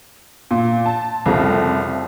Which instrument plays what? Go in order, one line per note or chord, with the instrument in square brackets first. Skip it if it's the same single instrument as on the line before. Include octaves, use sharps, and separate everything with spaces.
[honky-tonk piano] A#2
A5
[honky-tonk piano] C2 [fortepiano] F2 C#3 A3